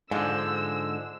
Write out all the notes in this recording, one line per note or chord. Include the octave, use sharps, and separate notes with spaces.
G#2 D3 F3 G#3 D4 E6